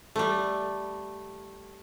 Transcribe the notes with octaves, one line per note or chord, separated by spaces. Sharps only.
G3 A3